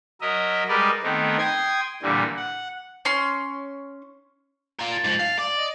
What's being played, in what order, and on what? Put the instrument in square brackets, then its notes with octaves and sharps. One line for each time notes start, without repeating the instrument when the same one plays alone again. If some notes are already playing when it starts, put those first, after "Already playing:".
[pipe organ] F#3 A#4 D#5 E5
G3 G#3 A#4 B4 D5 D#5
D#3 A3 B3 C4 D#4
G5 C6 D#6 G#6
A#2 D3 E3 G3
F#5
[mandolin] C#4 C6
[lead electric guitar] F4 A#4
[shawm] A5
[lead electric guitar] G#2 F3
F5
D5
[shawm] D#5